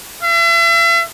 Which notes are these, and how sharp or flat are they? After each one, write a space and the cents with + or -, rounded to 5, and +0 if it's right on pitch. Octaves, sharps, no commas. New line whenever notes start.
E5 +40